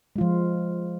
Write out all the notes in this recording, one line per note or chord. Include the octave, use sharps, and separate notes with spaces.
F3 G#3 F4